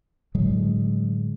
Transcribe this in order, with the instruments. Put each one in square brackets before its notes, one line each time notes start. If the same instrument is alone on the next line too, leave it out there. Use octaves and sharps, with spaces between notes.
[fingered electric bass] A2 D3 F#3 G#3